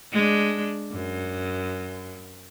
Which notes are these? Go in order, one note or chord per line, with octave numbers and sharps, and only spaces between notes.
G#3 D4
F#2